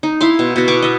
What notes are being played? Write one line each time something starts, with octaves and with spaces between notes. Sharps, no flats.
D#4
E4 F5 C6
B2
B2 F#4
B3 C#6 D6
D#5 E5